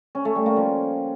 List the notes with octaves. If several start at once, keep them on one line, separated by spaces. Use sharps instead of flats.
C#4
A3
G3
A#3
F3